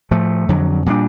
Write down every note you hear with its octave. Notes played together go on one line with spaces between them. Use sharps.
A2 F3 A3
F2 D3 F#3
A#2 G3 B3 D4